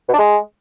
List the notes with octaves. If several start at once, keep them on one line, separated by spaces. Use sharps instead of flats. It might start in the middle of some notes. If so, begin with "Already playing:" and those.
B2
D4
G#3